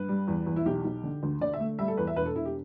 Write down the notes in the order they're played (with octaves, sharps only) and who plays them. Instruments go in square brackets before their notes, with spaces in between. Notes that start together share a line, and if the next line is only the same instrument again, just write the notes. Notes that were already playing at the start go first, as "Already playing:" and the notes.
Already playing: [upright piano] G2 B4
G3
E2
E2
E4
B1 G4
B1
D3
D2
D3 D5
E5
A3
G3 E5
A4
E2 B4
E5
E1 B4
A4
E1 E4
G4